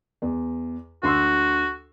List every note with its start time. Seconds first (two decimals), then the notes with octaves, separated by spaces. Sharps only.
0.22 E2
1.03 D2 F#4 C6 E6